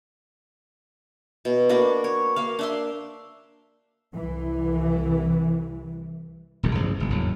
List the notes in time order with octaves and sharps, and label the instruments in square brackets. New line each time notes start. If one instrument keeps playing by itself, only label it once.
[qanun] B2
A#3 D4 F#4 B4
C#5
A#3 F5
D4 E5 C6
[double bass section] C2 E3
[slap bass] E1 B1 E2 D#3
A1 G2 C#3 F3
F#1 G#2 B2
F#1 E2 A2 F#3